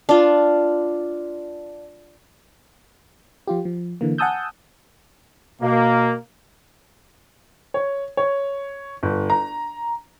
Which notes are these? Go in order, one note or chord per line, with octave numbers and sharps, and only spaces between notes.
D4 F4
F3 F4 G4
F3
D3 E3 A#3
F#5 G#5 A5 D#6 E6 G6
B2 A#3
C#5
C#5
G1
A#5